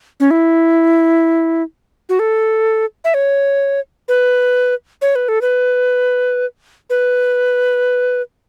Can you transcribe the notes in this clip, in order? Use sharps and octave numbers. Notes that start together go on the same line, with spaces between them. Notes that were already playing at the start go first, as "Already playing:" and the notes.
C#4
E4
F#4
A4
E5
C#5
B4
C#5
B4
A4
B4
B4